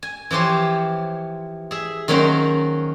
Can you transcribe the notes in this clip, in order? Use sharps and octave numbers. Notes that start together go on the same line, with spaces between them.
G#5
E3 F3 G4 C5 C#5
G#4 E5
D#3 F#3 A#3 C#4 D#4 C5